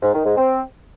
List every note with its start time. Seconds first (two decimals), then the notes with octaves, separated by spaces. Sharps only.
0.02 G#2
0.14 D#3
0.25 G#2
0.37 C4